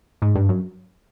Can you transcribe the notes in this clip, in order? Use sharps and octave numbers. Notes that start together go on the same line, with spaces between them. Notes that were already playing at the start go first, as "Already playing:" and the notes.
G#2
G2
F#2